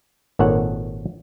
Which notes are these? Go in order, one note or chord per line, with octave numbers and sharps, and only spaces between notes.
G#1 A#2 D#3 A4 C#5 F#5